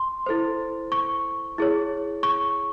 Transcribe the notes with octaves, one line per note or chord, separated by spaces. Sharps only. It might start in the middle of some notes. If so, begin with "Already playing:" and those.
Already playing: C6
E4 A4 C5
C#6
E4 G#4 C#5
C#6